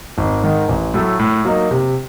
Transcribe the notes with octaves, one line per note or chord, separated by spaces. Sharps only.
G#1
G#2 D#3
A1
A2 F#3 A3
A2
F#3 A#3 D#4
C3